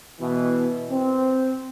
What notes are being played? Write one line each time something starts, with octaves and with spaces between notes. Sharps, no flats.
B2 E3
C4